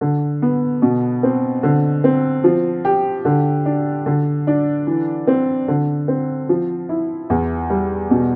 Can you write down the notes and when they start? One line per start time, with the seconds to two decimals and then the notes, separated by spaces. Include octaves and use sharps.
0.01 D3
0.42 B3
0.82 B2
1.23 C4
1.63 D3
2.04 C4
2.44 F3
2.85 G4
3.25 D3
3.65 D4
4.06 D3
4.47 D4
4.87 E3
5.27 C4
5.68 D3
6.08 C4
6.49 F3
6.89 E4
7.30 E2
7.70 G3
8.10 B2